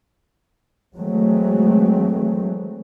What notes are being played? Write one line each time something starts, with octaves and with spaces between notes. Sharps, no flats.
E3 F#3 G#3 A3 C4